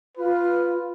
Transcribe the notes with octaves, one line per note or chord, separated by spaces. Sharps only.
F4 B4